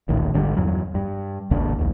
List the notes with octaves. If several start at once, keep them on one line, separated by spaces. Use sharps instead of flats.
E1 A#1 D#2 A2
G#1 D3 G3
E2 G2 F#3
G2
G#1 D#2 C#3 D4
A#1 D#2